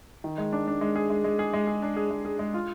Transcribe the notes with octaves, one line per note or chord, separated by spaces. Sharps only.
D#3
G#3
D4
D4
G#3
G#4
G#3
G#3
G#4
G#3
G#4
D4
G#4
G#3
G#4
G#3
F4